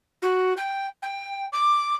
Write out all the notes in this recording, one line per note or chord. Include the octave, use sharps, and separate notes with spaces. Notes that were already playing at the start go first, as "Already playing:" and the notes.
F#4
G5
G5
D6